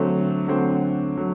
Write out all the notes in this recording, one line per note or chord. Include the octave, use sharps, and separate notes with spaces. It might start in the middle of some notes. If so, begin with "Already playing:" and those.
Already playing: D3 F#3 A3 C4
D3 F#3 A3 C4
F#3 A3